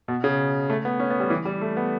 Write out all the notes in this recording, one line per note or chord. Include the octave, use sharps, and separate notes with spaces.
B2
C#3
A3
B3
C#4
B3
G3
E3
G3
A3
B3